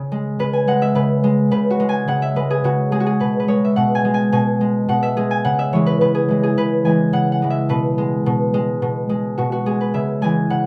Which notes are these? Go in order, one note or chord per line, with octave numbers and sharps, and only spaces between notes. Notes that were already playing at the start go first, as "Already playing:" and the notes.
Already playing: C#3
G#3
C#3 B4
G#5
G#3 F#5
E5
C#3 B4
G#3
C#3 B4
F#4
G#3
G#5
C#3 F#5
E5
G#3 B4
G#4
C#3 F#4
G#3 G#4
F#4
G#4
B2 B4
B4
G#3 C#5
E5
B2 F#5
G#5
G#3
G#5
B2 G#5
G#3
B2 F#5
E5
G#3 G#4
G#5
C#3 F#5
E5
E3 G#3 C#5
B4
C#3 B4
G#4
E3 G#3
G#4
C#3 B4
E3 G#3 G#5
C#3 F#5
F#5
E3 G#3
E5
B2 B4
G#3
B2
G#3
B2
G#3
B2 F#4
F#4
G#3 G#4
B4
C#3 E5
E3 G#3 G#5
C#3 F#5